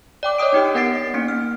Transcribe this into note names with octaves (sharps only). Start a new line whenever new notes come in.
D5 G5 D6
C#5 D#5 G5 D#6 D7
D4 D#4 G4
B3 A#4 F#5 A6 C7 D7
A#3 C#4 D#4 C#7
F6